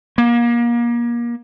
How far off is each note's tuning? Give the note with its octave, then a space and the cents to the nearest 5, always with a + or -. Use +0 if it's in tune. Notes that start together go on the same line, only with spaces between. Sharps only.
A#3 +30